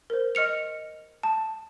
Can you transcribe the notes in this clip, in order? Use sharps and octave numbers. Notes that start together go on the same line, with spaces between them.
A#4 C5
D#5 F6 C#7 F7
A5